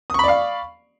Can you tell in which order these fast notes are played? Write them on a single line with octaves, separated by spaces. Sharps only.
D#6 C#6 B5 D5 F5